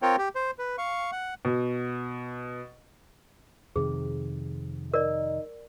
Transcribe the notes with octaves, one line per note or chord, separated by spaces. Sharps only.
C4 F4 A#4 C#5 G5
G4
C5
B4
F5 C#6
F#5
B2
F2 C3 D#3 G#4
D#4 A#4 D5